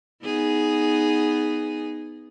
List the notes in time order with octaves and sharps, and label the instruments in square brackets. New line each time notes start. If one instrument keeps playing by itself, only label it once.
[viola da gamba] B3 D#4 G#4